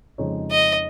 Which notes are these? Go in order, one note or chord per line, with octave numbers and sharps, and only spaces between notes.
F2 C#3 G#3 D#4 C#5
D#5